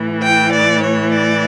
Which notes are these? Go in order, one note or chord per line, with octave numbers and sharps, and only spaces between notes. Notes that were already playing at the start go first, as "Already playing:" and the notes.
Already playing: A2 E3
G5
D5
C#5
D5